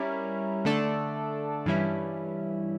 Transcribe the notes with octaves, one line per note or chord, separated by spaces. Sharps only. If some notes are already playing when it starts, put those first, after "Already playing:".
Already playing: G3 C#4 E4 A#4
D3 A3 D4 A4 D5
G2 E3 G3 C#4 E4